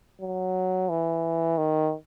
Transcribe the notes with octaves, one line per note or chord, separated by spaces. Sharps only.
F#3
E3
D#3